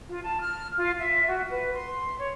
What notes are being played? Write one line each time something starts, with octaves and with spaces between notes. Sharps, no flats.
F4
A5
F6
F4
E5
F#4
B4
C6
C#5